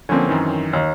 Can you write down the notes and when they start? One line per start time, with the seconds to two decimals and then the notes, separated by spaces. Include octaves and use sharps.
0.09 D3 F3 A#3 C4 C#4
0.27 F#2 D#3 E3
0.73 D#2